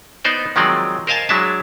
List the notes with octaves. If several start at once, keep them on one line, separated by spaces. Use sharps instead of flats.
B3 D#4 C5 D5
D#3 F3 F#3 G#3 C4 D5
A#4 C5 D#5 F5 G#5 A5
F#3 G#3 D4 E4 E5 A5